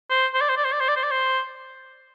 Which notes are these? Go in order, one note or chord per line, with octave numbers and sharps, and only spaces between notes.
C5
C5
D5
C5
D5
C5
D5
C5
D5
C5
D5
C5